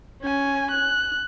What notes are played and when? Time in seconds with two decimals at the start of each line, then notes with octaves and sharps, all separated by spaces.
0.22 C#4 G#5
0.71 F#6